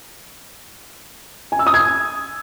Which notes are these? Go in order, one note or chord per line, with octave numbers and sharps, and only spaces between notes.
G#5
E6
D#6
G#6